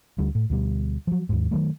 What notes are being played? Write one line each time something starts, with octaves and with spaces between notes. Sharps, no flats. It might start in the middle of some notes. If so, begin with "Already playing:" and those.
D2 D3 G3
A2
D2 B2 G3
F3 F#3
D#2 G#2
D#3 F3 F#3 A3